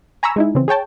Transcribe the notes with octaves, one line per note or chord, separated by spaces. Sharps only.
G#5 A#5 B5 C#6 E6
G#3 D#4 E4
C#3 E3 C4
G#4 C#5 G5 A5